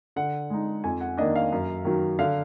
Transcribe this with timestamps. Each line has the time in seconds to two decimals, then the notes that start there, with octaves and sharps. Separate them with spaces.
0.16 D3 F#5
0.50 G#3 D#4
0.84 F2 G#5
1.01 F#5
1.17 D#3 A#3 D4 D#5
1.36 F5
1.52 F#2
1.85 D#3 F#3
2.19 D3 F5